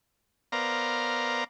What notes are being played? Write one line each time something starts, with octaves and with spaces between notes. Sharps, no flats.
B3 A#4 C5 D5 F5 A#5